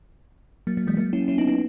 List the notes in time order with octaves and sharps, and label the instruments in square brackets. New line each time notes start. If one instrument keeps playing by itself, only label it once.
[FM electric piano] F#3 A#3
F#3 A#3
E3 G#3
F#3 A#3
C#4 E4
C#4 E4
B3 D#4
B3 D#4